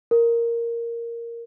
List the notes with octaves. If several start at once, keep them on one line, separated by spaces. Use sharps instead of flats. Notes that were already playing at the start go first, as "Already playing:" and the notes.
A#4